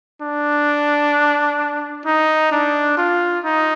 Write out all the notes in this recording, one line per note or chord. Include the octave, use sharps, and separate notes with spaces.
D4
D#4
D4
F4
D#4